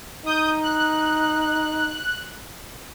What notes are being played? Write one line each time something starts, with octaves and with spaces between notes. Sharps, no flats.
D#4 D#6 G6
F#6